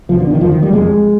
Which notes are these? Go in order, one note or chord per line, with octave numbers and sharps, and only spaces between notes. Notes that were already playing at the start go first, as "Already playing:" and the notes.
C2 B2 F3
D3
D#3
F2 D3 F3
D#3
G3
F2 C3 G#3